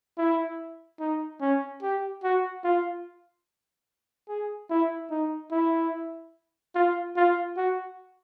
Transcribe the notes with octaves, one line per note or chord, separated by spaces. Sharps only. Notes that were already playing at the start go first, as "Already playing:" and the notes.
E4
D#4
C#4
G4
F#4
F4
G#4
E4
D#4
E4
F4
F4
F#4